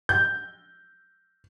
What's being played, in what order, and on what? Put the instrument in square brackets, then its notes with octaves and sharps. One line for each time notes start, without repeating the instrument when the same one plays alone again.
[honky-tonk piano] G6